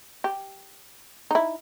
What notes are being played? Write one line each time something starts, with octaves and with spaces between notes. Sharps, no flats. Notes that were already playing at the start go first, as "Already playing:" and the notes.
G4
D#4 E4